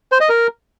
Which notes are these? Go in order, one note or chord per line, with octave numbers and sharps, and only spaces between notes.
C5
D#5
A#4